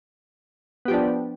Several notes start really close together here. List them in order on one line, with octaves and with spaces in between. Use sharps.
B3 G4 F3 D4